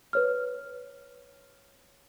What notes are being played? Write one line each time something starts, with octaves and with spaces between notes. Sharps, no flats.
B4 C#5 F6